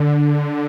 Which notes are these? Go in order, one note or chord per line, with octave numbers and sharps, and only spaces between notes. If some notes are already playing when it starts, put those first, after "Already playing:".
Already playing: D3